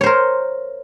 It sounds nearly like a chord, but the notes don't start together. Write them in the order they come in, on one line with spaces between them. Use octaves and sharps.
C#5 C5 A#4